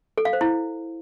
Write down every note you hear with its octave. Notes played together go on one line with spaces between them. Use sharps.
A4
F5
C5
E4